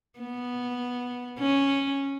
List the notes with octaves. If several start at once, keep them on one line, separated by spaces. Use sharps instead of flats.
B3
C#4